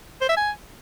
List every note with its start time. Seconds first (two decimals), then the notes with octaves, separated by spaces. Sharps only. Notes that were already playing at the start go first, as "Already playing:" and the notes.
0.21 C5
0.29 E5
0.37 G#5